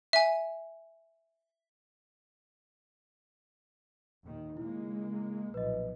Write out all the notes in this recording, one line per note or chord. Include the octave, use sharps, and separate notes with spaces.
E5 G#5
D#2 A#2 D#3
C#3 G#3 A#3 E4
B1 A#2 F3 B4 D#5